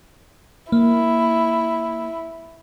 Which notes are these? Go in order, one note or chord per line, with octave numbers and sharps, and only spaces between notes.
A#3 E4